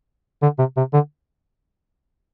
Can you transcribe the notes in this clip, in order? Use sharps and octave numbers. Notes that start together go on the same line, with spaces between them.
D3
C3
C3
D3